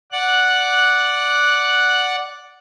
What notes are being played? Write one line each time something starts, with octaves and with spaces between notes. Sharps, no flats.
D5 F#5 F#6